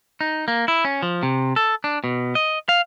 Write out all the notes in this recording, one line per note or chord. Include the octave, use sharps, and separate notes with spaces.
D#4
A#3
E4
C#4
F3
C3
A4
D4
B2
D#5
F5